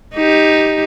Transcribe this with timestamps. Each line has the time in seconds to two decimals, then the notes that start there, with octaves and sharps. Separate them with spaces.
0.15 D#4 G4